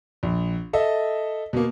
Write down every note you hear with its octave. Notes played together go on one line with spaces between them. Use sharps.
A#1
A4 D#5 E5
B2 A#3